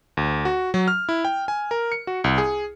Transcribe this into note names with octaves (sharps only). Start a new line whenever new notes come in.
D2
F#4
F#3
F6
E4
G5
G#5
A#4
C#7
F#4
C2
G#4